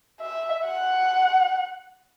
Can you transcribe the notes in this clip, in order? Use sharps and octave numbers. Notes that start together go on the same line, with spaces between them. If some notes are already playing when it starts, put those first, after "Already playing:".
E5
F#5